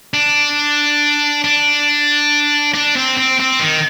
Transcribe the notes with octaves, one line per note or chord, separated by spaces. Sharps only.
D4
D4
D4
C4
C4
C4
D#3